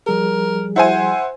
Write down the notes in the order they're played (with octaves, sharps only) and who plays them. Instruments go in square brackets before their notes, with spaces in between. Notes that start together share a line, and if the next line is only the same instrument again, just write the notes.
[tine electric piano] F3 G3 G#4 [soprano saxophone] A#4
[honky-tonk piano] E4 C5 G#5 [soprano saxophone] F#5